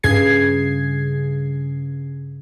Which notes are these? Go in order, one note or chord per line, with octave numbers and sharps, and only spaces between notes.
G2 C#3 G#4 G#6 C7